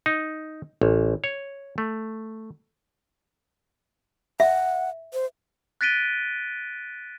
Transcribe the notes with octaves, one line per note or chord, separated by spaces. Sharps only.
D#4
A1
C#5
A3
E5 F#5
C5
F#6 A6 B6 D7 D#7 G7